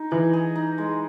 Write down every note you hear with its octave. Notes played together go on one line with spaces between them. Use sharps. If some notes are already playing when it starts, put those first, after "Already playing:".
Already playing: D#4
E3 G#4
G#4
D#4
G#3